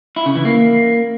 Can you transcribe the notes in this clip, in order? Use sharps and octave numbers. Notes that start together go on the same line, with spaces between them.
E4
C#3
E3
A#3